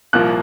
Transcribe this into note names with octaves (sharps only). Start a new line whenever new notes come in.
C2 A#2 F3 A#3 F#6